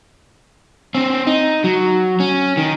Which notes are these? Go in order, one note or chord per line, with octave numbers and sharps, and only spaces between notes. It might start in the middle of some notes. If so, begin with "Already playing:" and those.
C4 C#4
D#4
F#3
C#4
D#3